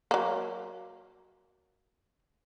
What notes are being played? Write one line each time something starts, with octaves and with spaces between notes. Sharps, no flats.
F#3 A#3